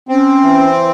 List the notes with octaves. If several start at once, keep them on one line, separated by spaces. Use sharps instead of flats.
C4 C#4
E3